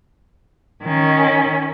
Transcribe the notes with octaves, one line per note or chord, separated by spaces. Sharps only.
D#3 C#4